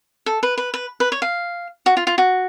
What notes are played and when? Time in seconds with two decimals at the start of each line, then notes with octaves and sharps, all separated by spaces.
0.26 A4
0.43 B4
0.58 B4
0.74 B4
1.00 B4
1.12 C#5
1.22 F5
1.86 F#4
1.97 F4
2.07 F4
2.18 F#4